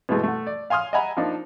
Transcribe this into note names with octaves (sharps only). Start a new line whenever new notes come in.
B2 E3 G#3 A3
A3 F#5
D5
F5 G#5 C6 D#6 F6
D#5 E5 F#5 G#5 A#5 B5
F3 A#3 D4 D#4